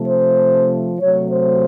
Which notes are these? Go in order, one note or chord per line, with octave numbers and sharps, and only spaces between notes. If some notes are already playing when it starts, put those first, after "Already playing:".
Already playing: C3 F3 A3
C5
C3 F#3 A3 C#5
C5